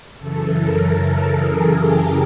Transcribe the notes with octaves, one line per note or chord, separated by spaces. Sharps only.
F#2 C#3 E3 A4
A#4
A4
G#4
G4